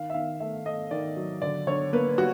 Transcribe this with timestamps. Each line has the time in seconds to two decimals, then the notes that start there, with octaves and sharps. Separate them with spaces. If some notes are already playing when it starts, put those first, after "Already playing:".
Already playing: D#3 F5
0.10 E5
0.14 D#3 F5
0.40 A3 E5
0.66 A3 D#5
0.91 D#3 D5
1.16 F#3
1.42 D3 D5
1.67 D3 C#5
1.93 A#3 B4
2.18 G3 F#4